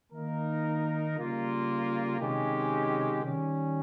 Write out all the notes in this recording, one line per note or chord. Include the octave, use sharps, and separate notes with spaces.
D#3 A#3 D#4 A#4
C#3 G3 A#3 F4
C3 D#3 G#3 C#4 G4
D#3 G3 C#4